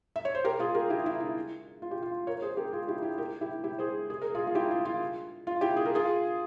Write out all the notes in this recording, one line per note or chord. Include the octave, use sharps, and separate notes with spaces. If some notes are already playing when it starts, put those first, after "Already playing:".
E5
C#5
C5
G4 A#4
F4 G#4
G4 A#4
E4 G4
E4
E4
F4
G4
F4
A#4 C#5
G#4 C5
G4 A#4
F4 G#4
E4 G4
E4 G4
G4 A#4
E4 G4
E4 G4
G#4 C5
G#4
A#4
F4 G#4
F4
E4 G4
F4
F4
F4
E4 G4
G#4
A#4
F4 G#4